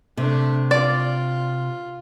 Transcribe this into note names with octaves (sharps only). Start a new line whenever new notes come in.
C3 A3 D4
F4 D5